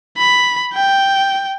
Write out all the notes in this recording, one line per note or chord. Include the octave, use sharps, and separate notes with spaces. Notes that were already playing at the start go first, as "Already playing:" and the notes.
B5
G5